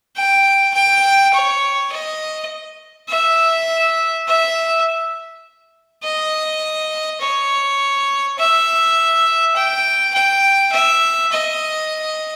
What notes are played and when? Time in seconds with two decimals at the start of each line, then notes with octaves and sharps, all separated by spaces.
0.17 G5
0.74 G5
1.34 C#5
1.92 D#5
3.09 E5
4.28 E5
6.04 D#5
7.21 C#5
8.39 E5
9.56 G5
10.14 G5
10.73 E5
11.32 D#5